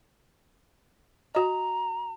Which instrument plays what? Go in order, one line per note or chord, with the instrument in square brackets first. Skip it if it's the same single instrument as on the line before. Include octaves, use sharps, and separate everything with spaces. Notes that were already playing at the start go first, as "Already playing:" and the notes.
[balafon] F#4 D#5 [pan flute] A#5